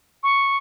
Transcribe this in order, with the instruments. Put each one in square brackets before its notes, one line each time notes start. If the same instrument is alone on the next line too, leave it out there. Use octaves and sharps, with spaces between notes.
[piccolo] C#6